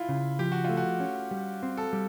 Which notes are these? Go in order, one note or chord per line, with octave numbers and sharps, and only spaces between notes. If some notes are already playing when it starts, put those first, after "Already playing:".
Already playing: E4 F4
C#3
F3 G4
F#4
A3 F4
F#4
C#4
G3
C4
A4
G3